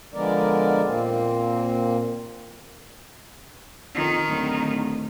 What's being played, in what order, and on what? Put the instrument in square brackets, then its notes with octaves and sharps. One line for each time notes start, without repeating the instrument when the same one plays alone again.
[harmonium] D3 F3 G#3 B3 A#4 D5
A#2 A#3 C4
[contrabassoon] F2 [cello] D#3
[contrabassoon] D1